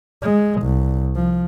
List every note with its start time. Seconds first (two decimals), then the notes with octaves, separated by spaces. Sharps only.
0.22 G#3
0.62 C2
1.15 F3